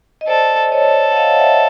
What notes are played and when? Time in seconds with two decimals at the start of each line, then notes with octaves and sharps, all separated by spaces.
0.21 D#5
0.27 A4 C5 D5
0.72 A4 C#5 D#5
1.12 F#5
1.17 D#5 F5
1.39 E5 F#5